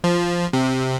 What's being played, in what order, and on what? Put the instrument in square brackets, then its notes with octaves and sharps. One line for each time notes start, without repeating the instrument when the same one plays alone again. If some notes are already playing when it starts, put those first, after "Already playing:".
[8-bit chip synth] F3
C3